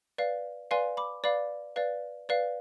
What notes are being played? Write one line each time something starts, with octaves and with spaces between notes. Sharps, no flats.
B4 D5 F5
B4 D5 F5 G#5 C6
B5 D6
B4 D5 F5 B5 D6
B4 D5 F5
B4 D5 F5